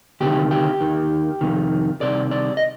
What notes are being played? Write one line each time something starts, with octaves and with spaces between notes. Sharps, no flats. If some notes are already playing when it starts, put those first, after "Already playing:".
D2 C3 D#3 G4
G4
D#2 D#3
F2 C3 D#3
C2 C3 D#3 D5
D5
D#5